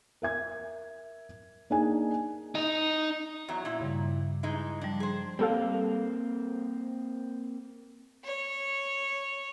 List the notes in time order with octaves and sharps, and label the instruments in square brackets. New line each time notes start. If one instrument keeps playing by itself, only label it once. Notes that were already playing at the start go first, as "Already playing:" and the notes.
[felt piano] A#4 E5 G#6
A#3 D4 D#4 G#4 G#5
[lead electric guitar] D#4 D#5
[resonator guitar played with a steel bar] E2 F#3 A#5
A#2 E4
[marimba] G2 C#3 G3
[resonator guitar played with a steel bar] E3 G#3 D#4
[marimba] F3 G3 [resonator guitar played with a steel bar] D4
[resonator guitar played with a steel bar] G#4 C5
[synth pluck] G3 A4 F5 [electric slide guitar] A#3 C4
[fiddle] C#5